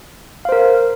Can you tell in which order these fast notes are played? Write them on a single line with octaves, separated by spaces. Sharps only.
F5 C5 A#4